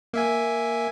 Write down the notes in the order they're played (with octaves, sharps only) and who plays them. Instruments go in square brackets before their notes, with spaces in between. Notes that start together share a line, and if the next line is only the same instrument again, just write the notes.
[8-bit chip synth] A#3 E5 G#5